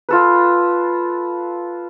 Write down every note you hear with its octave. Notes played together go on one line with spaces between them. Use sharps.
F4 A4 B4